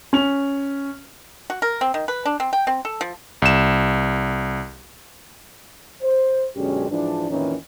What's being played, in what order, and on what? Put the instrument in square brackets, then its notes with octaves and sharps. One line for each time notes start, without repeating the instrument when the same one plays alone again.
[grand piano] C#4 F7
[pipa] F#4
A#4
C4
D#3
B4
D4
C4
G5
C4
A4
F3
[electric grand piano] C2 E7
[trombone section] C5
F#2 B2 D3 G#3 C#4 G4
G#2 E3 F3 D4
F2 A#2 D#3 E3 C#4